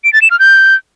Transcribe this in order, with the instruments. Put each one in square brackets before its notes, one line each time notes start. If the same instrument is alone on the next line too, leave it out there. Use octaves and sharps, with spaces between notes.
[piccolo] D7
A6
E7
F6
G6